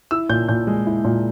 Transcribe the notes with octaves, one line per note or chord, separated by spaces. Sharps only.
E4 E6
A#2 G6
A#2 G6
G#3
E4
A#2